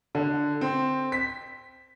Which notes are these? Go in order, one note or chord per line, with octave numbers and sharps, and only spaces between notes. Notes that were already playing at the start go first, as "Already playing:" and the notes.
D3
C4
B6